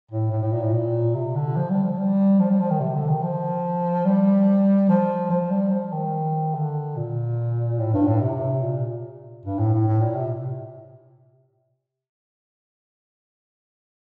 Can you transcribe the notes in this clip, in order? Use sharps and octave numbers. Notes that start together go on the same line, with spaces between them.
A2
A2
A2
A#2
A2
A#2
C3
D3
F3
G3
F3
G3
F3
G3
F3
D#3
C3
D3
D#3
F3
G3
F3
F3
G3
F3
D#3
D3
A#2
A2
G2
A2
C3
A#2
G2
A2
A2
A2
A#2
C3